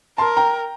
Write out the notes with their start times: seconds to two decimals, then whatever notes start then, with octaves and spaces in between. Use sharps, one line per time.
0.18 A#4 A5 C6
0.37 G5 A#5